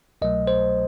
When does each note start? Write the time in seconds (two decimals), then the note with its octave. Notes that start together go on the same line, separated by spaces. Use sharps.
0.22 C2 B2 F#3 A3 D#5
0.47 C5